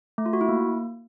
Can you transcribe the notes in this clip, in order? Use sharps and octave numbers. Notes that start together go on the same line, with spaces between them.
A3
F4
F#4
E4
A#3